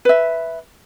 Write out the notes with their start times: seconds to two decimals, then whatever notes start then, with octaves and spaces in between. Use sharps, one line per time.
0.05 B4 E5